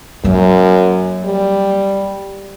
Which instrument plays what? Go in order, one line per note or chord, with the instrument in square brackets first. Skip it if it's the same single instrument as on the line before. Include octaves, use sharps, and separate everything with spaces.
[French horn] F#2 [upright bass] F#3 A#3
[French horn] G3